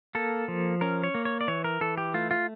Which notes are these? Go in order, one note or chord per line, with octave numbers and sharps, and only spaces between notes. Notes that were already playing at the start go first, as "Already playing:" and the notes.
A#3 A4
F3
C#4 A#4
C#5
A#3
C#5
D5
E3 C#5
A#4
E3 A4
G4
A3 F4
F4